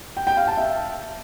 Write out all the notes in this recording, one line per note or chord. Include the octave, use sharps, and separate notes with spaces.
G5
G5
F5
A5
E5